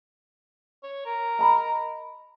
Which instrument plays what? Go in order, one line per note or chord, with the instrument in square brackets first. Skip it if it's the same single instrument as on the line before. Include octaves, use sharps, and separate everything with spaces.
[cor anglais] C#5
A#4
[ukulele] D#5 A#5 B5